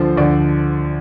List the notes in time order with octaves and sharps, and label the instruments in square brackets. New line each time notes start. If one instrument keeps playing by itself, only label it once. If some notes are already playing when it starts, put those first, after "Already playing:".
Already playing: [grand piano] D2 D3 F3 C5
D2 D3 F3 D5